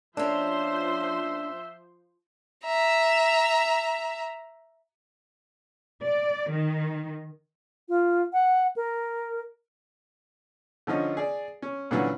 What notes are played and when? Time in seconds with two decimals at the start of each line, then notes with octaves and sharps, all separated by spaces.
0.17 F3 A#3 C#4 D4 C5 E5 C6
2.65 E5 A#5
6.03 D5
6.49 D#3
7.89 F4
8.33 F#5
8.76 A#4
10.87 D3 F3 C#4 D#4
11.17 G#4 D5
11.62 C#4
11.91 A#2 D3 E3 F#3 C#4